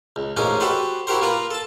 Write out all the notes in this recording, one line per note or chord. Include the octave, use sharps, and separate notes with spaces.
C#2
A1 F2 G#2 A#3 C#4 D#5
F#4 G4 A4 B4 C5
E4 F#4 G4 A#4 C5
A#3 F4 B4 A#5
A4 A5